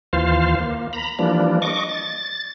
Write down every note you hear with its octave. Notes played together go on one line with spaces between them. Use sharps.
D#2 E3 F4 C5 F5
A#3
A#5 B5
E3 F3 G3 A#3 D4
D#5 C#6 D6
A6